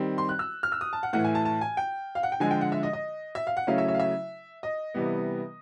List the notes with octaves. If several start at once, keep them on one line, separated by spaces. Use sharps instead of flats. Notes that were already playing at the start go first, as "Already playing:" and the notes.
Already playing: D#3 G3 C4
C6
F#6
E6
F6
E6
D#6
A5
F#5
A2 E3 A3 F#5
G#5
A5
A5
G#5
G5
F5
F#5
G5
D3 F3 G#3 G#5
G5
F#5
E5
D#5
D#5
E5
F5
F#5
C#3 F#3 A3 C#4 E4 F5
E5
E5
F5
E5
D#5
C3 E3 G3 B3